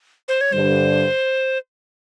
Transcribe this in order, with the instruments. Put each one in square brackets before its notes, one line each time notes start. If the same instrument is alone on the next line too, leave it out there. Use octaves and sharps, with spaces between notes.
[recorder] C5
C#5
[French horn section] G2 D3 G3 [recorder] C5